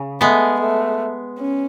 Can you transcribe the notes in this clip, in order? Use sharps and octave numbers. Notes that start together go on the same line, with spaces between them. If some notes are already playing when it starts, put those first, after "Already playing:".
Already playing: C#3
G#3 A3 B3
A3
C#4